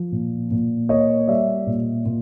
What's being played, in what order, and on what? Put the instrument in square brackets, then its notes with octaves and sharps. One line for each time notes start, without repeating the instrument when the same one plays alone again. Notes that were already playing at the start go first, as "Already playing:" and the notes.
Already playing: [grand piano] F3
A#2
A#2
A#3 C#5 D#5
G3 D5 E5
A#2
A#2